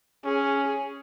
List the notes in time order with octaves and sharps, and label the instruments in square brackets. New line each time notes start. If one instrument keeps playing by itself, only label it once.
[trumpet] C#4 [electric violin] G#4